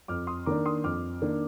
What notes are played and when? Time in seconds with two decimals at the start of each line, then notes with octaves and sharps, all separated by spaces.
0.08 F2 D6 F6
0.27 C6 D#6
0.46 D#3 A#3 D4 A#5 D6
0.66 C6 D#6
0.84 F2 D6 F6
1.22 D#3 A#3 D4